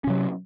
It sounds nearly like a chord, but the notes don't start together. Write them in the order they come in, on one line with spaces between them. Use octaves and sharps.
C#4 C3 F#3